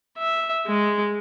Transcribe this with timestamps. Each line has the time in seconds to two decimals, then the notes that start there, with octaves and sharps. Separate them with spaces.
0.18 E5
0.66 G#3